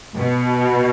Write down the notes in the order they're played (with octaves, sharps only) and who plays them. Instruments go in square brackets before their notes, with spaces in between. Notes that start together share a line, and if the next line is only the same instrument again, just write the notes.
[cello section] B2